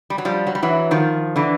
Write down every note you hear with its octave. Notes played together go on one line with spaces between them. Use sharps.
G3
F#3
F3 G3
F#3
G3
E3 F#3
D#3 F3
D3 E3